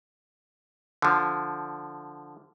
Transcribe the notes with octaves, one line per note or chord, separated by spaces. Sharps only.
D3 F3